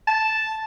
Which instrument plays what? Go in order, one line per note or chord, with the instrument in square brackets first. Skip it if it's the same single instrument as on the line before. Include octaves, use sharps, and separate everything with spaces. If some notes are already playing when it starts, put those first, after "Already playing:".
[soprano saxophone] A5